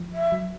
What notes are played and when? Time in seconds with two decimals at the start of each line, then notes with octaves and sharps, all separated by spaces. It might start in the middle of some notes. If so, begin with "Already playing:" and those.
Already playing: F3
0.13 E5
0.32 F#3